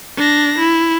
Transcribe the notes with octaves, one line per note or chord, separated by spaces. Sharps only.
D4 A#6
E4